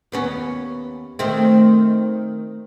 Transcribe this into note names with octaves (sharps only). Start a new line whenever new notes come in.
D#2 B3 C#4
D#3 A3 C4